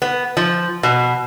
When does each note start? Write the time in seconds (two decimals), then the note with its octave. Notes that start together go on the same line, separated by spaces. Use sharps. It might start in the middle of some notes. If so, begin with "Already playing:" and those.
0.02 B3
0.37 F3
0.83 B2